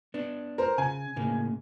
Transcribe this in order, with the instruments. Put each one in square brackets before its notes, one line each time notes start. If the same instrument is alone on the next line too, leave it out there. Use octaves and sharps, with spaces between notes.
[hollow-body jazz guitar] B3 D4
[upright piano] A#4 C5
[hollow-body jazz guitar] C#3 [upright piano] G#5
[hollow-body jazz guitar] A2 C#3 A#3